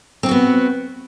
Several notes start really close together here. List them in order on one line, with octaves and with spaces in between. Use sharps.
C4 G4 F#4 B3